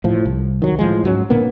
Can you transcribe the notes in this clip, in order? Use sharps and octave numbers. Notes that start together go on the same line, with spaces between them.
A2 F3
C2
D#3 F#3
A2 F3 G#3
G#2 F#3 A#3 C#4
A#2 D3 A#3 B3